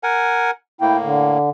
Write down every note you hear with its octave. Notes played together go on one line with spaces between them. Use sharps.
A#4 F#5 G#5
A2 A#3 E4 G5
D3